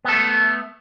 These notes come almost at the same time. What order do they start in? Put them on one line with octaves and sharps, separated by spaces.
B3 A4 A3